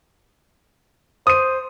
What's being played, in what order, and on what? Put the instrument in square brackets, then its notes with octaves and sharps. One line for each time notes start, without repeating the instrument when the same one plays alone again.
[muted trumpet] C5 [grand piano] D#6 D#7